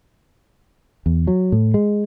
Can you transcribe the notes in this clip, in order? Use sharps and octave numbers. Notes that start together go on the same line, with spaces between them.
E2
F#3
A2
G#3